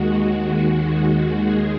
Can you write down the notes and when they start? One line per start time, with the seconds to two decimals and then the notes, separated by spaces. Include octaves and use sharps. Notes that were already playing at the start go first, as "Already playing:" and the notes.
Already playing: D#2 D#3 G#3 F#4
1.43 G#4